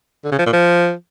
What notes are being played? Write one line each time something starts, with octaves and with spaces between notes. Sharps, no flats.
D3
C#3
F3
A#2
F3